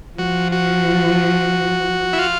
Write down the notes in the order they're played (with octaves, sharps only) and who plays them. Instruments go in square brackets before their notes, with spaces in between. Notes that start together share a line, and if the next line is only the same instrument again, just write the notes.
[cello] F3 [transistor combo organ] F#4
[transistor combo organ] F#4
E4
F4